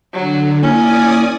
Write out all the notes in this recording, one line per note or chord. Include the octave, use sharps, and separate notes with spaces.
D3 F#3
A#3 C#4 E4 D5 G#5 D#6